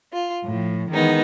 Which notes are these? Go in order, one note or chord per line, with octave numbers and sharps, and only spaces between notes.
F4
A2 F3
D#3 E3 G#3 B3 D#4